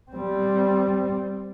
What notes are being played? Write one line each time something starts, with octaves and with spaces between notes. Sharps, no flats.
G3 C4